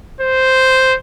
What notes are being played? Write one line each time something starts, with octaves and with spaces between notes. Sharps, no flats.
C5